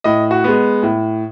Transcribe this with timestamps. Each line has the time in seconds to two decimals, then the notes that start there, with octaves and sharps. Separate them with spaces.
0.04 A2 D#5
0.31 F#4
0.44 G#3 B3
0.83 A2